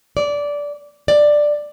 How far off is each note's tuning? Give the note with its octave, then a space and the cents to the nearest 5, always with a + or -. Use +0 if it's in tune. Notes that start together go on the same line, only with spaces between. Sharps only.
D5 -15
D5 +10